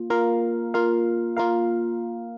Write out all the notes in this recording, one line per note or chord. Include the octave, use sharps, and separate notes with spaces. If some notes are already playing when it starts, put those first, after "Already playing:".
Already playing: A#3 F4
A#3 F4 A#4 F5
A#3 F4 A#4 F5
A#3 F4 A#4 F5